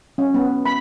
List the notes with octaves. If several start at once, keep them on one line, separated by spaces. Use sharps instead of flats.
C#4
B3
B5